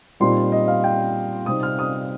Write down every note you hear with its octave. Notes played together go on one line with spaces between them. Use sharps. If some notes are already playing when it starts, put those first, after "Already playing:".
A#2 G3 C4 D#4 C6
D#5
F5
G5
C3 G3 C4 D#4 D#6
F6
D#6